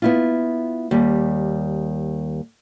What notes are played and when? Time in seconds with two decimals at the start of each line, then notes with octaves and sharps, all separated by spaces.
0.02 B3 E4 F4
0.91 D#2 G3